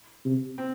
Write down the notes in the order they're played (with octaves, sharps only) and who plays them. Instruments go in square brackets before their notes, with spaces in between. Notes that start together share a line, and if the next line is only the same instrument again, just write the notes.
[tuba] C3
[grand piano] C4